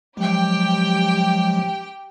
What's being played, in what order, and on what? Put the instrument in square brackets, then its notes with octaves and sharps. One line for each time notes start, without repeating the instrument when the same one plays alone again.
[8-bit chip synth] F3 F#3 G#3 [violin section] G4 G5